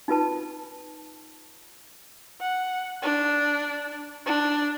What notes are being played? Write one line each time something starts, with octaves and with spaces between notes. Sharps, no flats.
D#4 F4 B4 A5
F#5
D4
D4